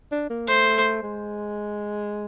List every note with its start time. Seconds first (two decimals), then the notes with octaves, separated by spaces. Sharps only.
0.12 D4
0.30 A#3
0.48 A3 C5
1.03 G#3